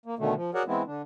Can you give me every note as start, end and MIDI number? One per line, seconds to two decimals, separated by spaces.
0.06 0.15 58
0.19 0.34 47
0.19 0.34 50
0.19 0.34 51
0.19 0.34 57
0.35 0.51 53
0.54 0.63 66
0.54 0.63 68
0.54 0.63 70
0.54 0.63 73
0.54 0.63 74
0.54 0.63 78
0.67 0.83 52
0.67 0.83 56
0.67 0.83 59
0.67 0.83 60
0.67 0.83 64
0.87 1.02 50
0.87 1.02 62